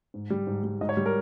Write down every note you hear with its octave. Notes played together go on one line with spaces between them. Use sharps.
G#2
G3
G#2
G3
G#2 D#5
C#5
G3
A#4